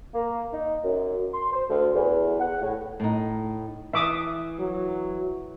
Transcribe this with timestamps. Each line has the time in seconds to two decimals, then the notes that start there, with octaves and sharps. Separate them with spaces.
0.14 A#3
0.53 D#4
0.84 F#2
1.34 C6
1.52 C5
1.70 D2
1.94 E2
2.40 F#5
2.62 A2
3.00 A2 D#4
3.93 E3 E5 D6 D#6
4.59 F#3